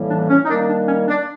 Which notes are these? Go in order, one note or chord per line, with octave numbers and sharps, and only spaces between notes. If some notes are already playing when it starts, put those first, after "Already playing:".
Already playing: A2 E3 G3 A#3
D4
C#4
D#4
D#3 G3 A#3 D4
D4
C#4
D4